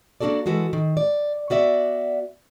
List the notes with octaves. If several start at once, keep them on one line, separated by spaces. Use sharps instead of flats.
A#3 D4 D#4 F#4 A4 D5
E3 G#3 F#4 A4 B4
D#3
D5
B3 F#4 D5 E5